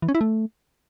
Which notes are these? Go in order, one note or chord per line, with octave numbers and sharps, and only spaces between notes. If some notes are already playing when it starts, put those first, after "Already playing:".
E3
C#4
E4
A3